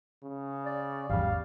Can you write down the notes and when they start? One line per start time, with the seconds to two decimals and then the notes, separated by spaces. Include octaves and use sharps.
0.23 C#3
0.65 D5
1.10 G#1 E2 G3 F5